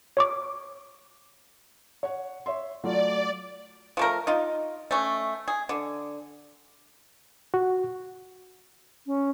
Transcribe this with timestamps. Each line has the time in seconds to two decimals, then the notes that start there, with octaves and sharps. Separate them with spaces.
0.17 C#5 C#6 D6
2.03 C#5 F#5
2.46 C#5 E5 C6
2.84 F#3 A3 F4 D5
3.97 F3 A3 A#4
4.27 D#4 F4
4.91 A3 C#4
5.48 G#4
5.69 D3
7.54 F#4
9.06 C#4